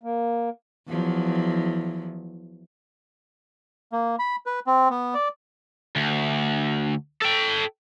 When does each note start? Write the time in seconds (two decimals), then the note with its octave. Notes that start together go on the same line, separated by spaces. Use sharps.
0.03 A#3
0.88 E2 F3 F#3
3.93 A#3
4.19 B5
4.46 B4
4.67 C4
4.90 B3
5.14 D5
5.96 D2
7.22 A4 G5